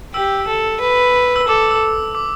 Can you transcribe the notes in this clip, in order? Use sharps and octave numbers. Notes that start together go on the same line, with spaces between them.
G4 E6
A4
B4
E6
A4 D6
E6
D6